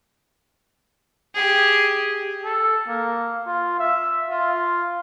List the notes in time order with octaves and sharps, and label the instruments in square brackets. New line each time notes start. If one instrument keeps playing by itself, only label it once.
[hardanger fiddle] G4 G#4
[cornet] A4
A#3
F4
E5
F4